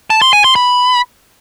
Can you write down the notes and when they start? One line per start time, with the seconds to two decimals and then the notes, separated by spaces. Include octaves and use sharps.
0.10 A5
0.22 C6
0.33 G#5
0.44 C6
0.56 B5